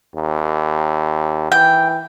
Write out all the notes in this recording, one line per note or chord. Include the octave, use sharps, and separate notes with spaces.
D#2
E3 G5